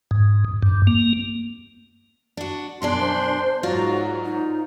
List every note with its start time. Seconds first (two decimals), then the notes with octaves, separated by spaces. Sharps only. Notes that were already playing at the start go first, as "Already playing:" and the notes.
0.11 G#2
0.63 G2
0.87 A#3
2.37 D4 F#4
2.82 F#2 B2 D4 G#4 D5 C6
3.01 C5
3.63 G#2 F#3 F4 F#4 A#4 D5
4.25 D#4